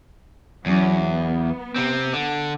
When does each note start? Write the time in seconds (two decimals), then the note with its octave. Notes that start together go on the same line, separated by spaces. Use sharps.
0.66 E2 F#3 C#4
1.03 B3
1.76 C3 C4
2.13 D3